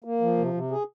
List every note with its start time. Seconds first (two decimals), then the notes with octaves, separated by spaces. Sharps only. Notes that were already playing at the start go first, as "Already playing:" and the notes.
0.04 A#3
0.21 F3
0.37 C3
0.53 C3
0.71 G#4